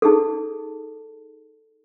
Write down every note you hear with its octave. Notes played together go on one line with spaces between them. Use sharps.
D#4 G#4 A4